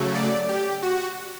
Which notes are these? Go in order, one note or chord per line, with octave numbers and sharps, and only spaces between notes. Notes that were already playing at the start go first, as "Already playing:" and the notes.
Already playing: C#3 F#3 A3
D5
G4
F#4